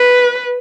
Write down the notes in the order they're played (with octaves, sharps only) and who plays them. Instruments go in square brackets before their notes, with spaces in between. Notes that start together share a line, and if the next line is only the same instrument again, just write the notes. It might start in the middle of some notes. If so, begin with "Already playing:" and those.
Already playing: [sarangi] B4